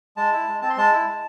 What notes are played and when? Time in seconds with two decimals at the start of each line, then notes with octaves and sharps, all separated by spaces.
0.17 G#3 A5
0.32 E4
0.47 G#3
0.61 C4 A5
0.70 C6
0.77 G#3 A5
0.92 E4
1.07 G#3